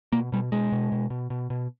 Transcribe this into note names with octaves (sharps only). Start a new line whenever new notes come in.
B2 A#3
B2 G3
B2 G#3
B2
B2
B2
B2
B2